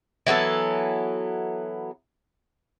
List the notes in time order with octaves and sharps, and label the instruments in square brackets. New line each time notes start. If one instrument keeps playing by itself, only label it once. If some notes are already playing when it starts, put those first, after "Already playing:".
[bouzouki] E3 F#3 B3 A4